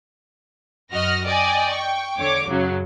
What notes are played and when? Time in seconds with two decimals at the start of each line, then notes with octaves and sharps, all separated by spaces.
0.92 F#2 F#4 D#5 F6 A#6
1.25 D5 D#5 G5 G#5
1.73 G5 C#6
2.18 E2 D3 C#5 D6
2.49 F#2 C#3 F#3